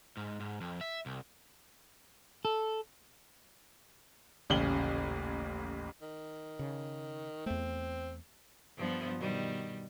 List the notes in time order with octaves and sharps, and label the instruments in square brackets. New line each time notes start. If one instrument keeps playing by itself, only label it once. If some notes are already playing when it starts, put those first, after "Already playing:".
[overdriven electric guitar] G#2
G#2
F2
E5
C2
[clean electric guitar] A4
[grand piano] D#1 A1 C#3 F#7 G7
[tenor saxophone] D#3
[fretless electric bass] C#3
[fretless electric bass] E2 A3 [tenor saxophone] C4
[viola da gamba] G2 F3 B3
B2 D#3 G3